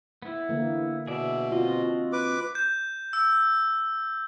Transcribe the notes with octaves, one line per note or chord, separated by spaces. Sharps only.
B3 E4
D3 E3 A#3
B2 G#4 D5 E5
C4 F4 F#4 D#5
B4 D6
G6
E6